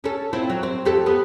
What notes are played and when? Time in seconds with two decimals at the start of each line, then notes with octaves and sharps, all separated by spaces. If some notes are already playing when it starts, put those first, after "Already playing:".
0.04 C#4 A4
0.33 C4 E4 F4
0.49 F#3
0.63 C4
0.85 F2 G4 A4
1.06 B3